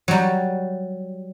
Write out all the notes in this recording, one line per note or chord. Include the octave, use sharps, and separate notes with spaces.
F#3 G3